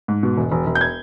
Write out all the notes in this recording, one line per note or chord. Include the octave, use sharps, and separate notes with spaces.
G#2
B2
E1
E1
E1
G6
G#6